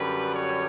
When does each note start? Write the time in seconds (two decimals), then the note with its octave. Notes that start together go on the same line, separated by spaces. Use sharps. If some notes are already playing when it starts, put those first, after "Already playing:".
Already playing: F#2 D3 G3 B4
0.33 C#5